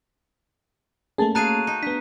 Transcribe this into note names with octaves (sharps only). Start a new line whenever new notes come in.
A3 A#3 C#4 G#4 A5
F#4 G#4 F5 A5 A#5 F#6 D#7
D#4
B3 D4 B6